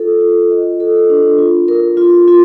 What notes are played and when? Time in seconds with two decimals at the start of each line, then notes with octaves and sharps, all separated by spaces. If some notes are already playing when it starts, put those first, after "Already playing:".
Already playing: F4 A4
0.21 F4
0.50 D#5
0.80 A4
1.10 D4
1.38 F4
1.68 A#4
1.97 F4
2.28 F4